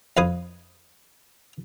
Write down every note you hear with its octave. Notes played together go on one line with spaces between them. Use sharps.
F2 B4 F5 G#5 D#6